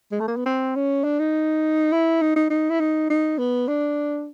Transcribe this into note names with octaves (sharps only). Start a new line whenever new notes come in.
G#3
A3
A#3
B3
C4
C#4
D4
D#4
E4
D#4
D#4
D#4
E4
D#4
D#4
B3
D4